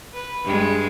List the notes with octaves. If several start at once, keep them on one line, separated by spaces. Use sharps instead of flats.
B4
G2 G#3